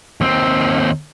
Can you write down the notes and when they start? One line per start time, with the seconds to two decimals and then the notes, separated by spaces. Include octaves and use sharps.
0.21 D#2 C4